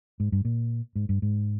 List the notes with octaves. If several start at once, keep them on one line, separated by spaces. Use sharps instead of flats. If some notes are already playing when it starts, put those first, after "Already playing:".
G#2
G2
A#2
G#2
G2
G#2